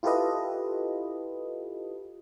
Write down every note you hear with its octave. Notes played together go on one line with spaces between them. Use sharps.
E4 F4 G4 A4 B4 D#5